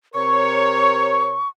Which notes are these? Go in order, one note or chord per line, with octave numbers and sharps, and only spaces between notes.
C3 A#4 C#5 C#6